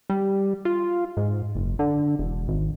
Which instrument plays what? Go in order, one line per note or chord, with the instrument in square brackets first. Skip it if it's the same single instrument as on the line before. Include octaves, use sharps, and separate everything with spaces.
[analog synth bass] G3
F4
G#2
F#1
D3
E1
G#1